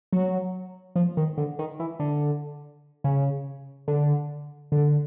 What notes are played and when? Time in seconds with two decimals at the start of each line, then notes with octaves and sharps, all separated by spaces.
0.13 F#3
0.96 F3
1.17 D#3
1.38 D3
1.59 D#3
1.80 E3
1.99 D3
3.04 C#3
3.88 D3
4.72 D3